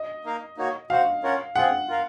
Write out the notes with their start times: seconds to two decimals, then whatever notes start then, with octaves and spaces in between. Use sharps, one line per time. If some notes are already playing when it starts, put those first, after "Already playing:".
Already playing: D#5
0.25 A#3 D#4 A#4 F5
0.57 A#3 D#4 F#4 C#5
0.90 F#4 C5 F5 F#5
1.23 C#4 F4 A#4 C#5 F#5
1.56 C4 F4 G#4 F#5
1.88 F4 A#4 F5